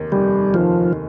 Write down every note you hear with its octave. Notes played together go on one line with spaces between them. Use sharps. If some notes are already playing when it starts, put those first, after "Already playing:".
Already playing: F1 D#2 D#3
F1 G3
D#2 D#3 F3